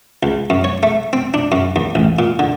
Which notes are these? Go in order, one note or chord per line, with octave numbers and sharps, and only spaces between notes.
C#2
F#2
C#5
A3
C4
D4
F#2
D#2
A1
A#2
D3